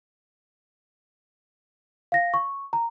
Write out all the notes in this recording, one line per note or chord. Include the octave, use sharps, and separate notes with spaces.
F5 A#6
C#6
A#5